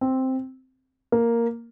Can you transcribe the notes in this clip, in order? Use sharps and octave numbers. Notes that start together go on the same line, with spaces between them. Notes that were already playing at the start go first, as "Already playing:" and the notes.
C4
A#3